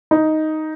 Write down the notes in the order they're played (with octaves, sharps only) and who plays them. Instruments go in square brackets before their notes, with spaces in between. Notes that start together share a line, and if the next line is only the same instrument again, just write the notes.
[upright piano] D#4